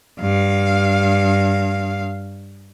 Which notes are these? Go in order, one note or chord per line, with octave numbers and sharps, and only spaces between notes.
G2 F5